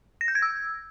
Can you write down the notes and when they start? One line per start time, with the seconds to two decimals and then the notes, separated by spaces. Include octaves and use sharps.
0.21 A#6
0.28 G6
0.35 G#6
0.42 E6